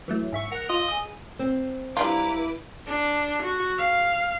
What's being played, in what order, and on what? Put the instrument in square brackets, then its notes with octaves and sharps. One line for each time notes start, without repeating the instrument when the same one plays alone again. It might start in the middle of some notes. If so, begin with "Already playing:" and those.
[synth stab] E3 F#3 A3
G#2 E5 C#6
[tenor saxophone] A#4 [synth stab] F#5
[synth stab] F4 [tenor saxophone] D#5
[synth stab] G#4 D#7
[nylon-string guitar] C4
[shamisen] G3 D4 F4 [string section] E4 B4 D6 [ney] A#5
[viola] D4
F#4
F5